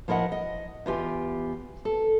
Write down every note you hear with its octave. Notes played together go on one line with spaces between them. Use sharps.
F3 E4 A#4 D#5 F#5
D#5
E2 F4 G4 G#5
A4